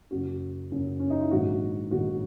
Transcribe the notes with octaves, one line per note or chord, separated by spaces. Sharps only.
F#1 F#2 C#3 F#4
F#1 F#2 C#3
C#4
D#4
E4
A#1 G#2 D#3 F#4
A#1 G#2 D#3 F#4